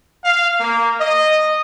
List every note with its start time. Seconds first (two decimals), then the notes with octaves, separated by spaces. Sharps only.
0.24 F5
0.60 A#3
0.99 D#5